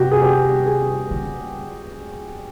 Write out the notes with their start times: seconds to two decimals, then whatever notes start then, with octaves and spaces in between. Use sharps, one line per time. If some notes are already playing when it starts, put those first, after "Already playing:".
Already playing: C3 F#4 G4
0.11 G#4
0.22 G4
0.66 G#4
1.11 C#3